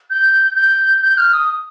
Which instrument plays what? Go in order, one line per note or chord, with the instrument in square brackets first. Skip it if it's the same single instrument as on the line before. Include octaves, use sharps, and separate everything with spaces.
[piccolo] G6
G6
G6
F6
D#6